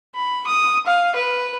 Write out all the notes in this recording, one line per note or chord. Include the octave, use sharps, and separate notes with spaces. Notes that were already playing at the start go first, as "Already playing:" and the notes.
B5
D#6
F5
B4